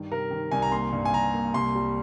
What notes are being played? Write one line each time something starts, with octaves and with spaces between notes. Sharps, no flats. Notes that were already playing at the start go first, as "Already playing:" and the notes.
Already playing: G2 D#3
C3 A#4
D#3
C2 G#5
A#5
A#3 C6
G2
G#5
G2 A#5
A#3
C2 C6
G3